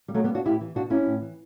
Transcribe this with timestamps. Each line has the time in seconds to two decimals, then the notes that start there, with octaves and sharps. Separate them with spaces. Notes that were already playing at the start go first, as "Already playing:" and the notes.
0.08 G3
0.14 B2 F#3 A3
0.24 G3 B3
0.35 D4 F#4
0.45 A2 E4 G4
0.61 E3
0.75 B2 D4 F#4
0.90 C#4 E4
1.06 A2
1.21 E3